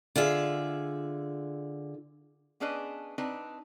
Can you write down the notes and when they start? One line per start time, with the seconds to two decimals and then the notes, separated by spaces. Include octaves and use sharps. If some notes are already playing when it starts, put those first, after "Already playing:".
0.16 D3 F4 G#4 E5
2.60 B3 C#4 D4 G#4 B4 D#5
3.18 C4 D4 D#4 B4